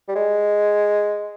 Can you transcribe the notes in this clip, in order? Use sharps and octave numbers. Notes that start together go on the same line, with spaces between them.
G3
G#3